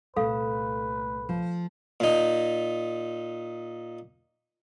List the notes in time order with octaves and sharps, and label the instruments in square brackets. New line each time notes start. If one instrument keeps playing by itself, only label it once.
[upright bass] C2 A#2 [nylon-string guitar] A3 [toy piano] A4 F5 [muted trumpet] B4
[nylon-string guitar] F3
[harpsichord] A#2 D#4